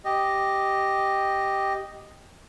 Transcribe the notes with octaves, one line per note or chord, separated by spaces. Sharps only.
G4 D#5